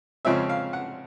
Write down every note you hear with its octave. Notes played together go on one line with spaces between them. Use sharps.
F2 C#3 F3 G#3 C4 E5
F5
F#5